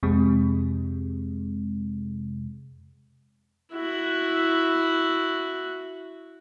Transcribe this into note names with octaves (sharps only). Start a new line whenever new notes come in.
F2 C3 G#3
E4 F#4